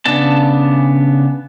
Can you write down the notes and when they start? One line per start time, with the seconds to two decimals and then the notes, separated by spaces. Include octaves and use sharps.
0.06 C#3 B3 D4 A5